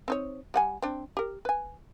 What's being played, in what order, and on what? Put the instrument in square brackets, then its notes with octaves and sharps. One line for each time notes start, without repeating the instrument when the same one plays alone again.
[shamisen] C4 D#4 C#5
G3 F#5 G#5
C4 D4
G4 A#4
B4 G#5